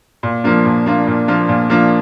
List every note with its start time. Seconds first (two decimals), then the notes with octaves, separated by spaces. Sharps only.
0.23 A#2
0.44 F3 A#3 D4 F4
0.65 A#2
0.86 F3 A#3 D4 F4
1.07 A#2
1.28 F3 A#3 D4 F4
1.49 A#2
1.70 F3 A#3 D4 F4